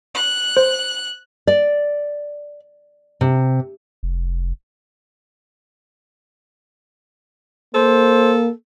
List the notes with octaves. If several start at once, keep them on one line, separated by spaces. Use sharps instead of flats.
F#6
C5
D5
C3
F1
A#3 A4 C5